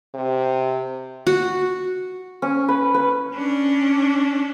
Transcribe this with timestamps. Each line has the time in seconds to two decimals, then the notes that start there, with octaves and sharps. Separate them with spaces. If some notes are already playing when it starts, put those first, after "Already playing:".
0.15 C3
1.27 F#4
2.42 C#4
2.68 B4
2.94 B4
3.34 C#4 D4